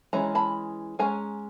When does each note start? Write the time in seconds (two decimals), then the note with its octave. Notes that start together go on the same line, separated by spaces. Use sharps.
0.13 E3 G#3 C#4 A#5
0.35 A5 B5
0.99 G#3 C#4 G#5 A#5